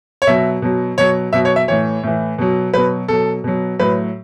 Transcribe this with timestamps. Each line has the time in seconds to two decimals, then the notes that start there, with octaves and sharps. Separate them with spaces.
0.22 C#5
0.27 B2 F#3 E5
0.62 B2 F#3
0.98 B2 F#3 C#5
1.33 B2 F#3 E5
1.45 C#5
1.56 E5
1.68 A2 E3 C#5
2.03 A2 E3
2.38 B2 F#3
2.74 B2 F#3 B4
3.08 B2 F#3 A4
3.44 B2 F#3
3.79 A2 F#3 B4